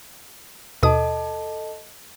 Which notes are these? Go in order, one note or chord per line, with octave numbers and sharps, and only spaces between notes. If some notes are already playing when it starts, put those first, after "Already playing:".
D#2 B2 A4 D#5 A5 D#6